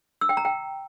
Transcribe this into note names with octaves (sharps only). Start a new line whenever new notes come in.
E6
G5
A#5
G5